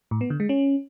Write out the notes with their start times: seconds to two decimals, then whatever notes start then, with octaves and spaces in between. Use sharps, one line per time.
0.11 A2
0.21 B3
0.30 D3
0.40 G#3
0.49 C#4